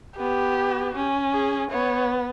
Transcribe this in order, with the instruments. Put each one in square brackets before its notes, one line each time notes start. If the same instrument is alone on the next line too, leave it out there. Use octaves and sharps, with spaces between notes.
[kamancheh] B3 [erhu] G4
[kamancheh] C#4
[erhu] G#4
[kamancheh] B3 [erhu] C#5